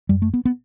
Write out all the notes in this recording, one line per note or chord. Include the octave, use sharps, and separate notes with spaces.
F#2 G3
A3
B3
B3